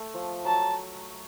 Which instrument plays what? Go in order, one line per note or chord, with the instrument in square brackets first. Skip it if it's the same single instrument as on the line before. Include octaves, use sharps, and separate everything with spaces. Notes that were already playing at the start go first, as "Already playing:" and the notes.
Already playing: [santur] A3
F3
[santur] F#3 [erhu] A5